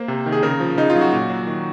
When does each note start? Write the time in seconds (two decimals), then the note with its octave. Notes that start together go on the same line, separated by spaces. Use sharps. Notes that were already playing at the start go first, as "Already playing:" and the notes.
Already playing: A#3 C5
0.08 C3
0.26 D#3
0.32 G#4
0.42 C#3 A#4
0.60 F3
0.77 C#3 D#4
0.90 F4
0.96 F#3
1.01 F#4
1.13 A#2
1.30 F#3
1.47 D#3